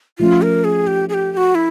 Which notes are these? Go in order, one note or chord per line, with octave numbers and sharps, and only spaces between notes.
F3 A3 C#4 F4
A#4
G#4
G4
G#4
G4
G4
F#4
E4